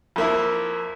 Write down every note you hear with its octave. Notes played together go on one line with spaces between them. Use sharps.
F2 A#3 E4